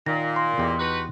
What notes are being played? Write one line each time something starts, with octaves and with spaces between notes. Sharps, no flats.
A#2 D#3 A#6
C6
E2 G4 D#5
D#4 F#4 B4